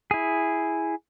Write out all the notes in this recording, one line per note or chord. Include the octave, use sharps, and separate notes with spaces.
E4 G#4